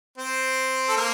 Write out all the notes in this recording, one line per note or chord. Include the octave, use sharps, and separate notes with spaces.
C4 C5
A4
A#3 A#4